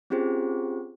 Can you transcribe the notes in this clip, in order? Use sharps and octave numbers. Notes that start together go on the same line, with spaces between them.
C4 C#4 F4 G4 G#4 C5